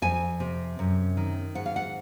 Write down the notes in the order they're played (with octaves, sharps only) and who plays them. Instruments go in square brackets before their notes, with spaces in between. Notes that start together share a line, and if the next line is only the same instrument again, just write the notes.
[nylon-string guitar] F2 G#5
C3
F#2
D#3
G#2 F#5
F5
F#5